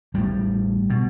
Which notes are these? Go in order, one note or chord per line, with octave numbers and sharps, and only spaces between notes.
A1 A2 G3
B2